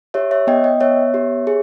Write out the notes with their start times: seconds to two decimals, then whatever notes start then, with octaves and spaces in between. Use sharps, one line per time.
0.14 G4 C#5 E5
0.31 C#5 E5
0.47 B3 D#5 G5
0.64 D#5 G5
0.80 B3 C#5 E5
1.14 G4
1.47 G#4